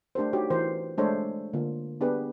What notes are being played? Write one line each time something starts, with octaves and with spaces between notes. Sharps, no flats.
A3 D4 G4 A#4 C5
D#4 F#4 G4 C#5
E3 F#4 A#4 C5
G#3 A3 D4 A4 C5 C#5
D3 A#3 F4
B3 D4 G4 G#4 B4